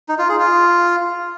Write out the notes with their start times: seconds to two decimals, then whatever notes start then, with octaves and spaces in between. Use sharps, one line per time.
0.08 D#4
0.19 F4
0.29 G#4
0.39 F4